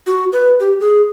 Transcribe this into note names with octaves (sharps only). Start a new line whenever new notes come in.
F#4
B4
G4
G#4